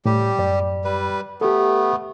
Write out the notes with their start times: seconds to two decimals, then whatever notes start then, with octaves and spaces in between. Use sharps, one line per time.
0.06 A2 G3 G4
0.39 F#2 D5
0.85 G3 B4
1.41 A3 B3 G4 A4